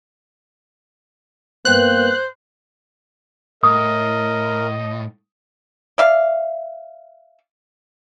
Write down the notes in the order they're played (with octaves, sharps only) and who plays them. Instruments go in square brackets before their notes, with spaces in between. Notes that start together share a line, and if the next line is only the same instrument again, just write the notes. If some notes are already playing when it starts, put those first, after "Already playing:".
[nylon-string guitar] G2 B3 G5 [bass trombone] A#3 [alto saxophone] C5 [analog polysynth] F#6
[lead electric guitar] A2 [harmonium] A#4 [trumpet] D#5 [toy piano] D#6
[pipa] D5 E5 F5